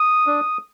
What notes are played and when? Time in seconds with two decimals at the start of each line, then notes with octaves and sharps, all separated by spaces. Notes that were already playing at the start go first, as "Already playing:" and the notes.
Already playing: D#6
0.27 D4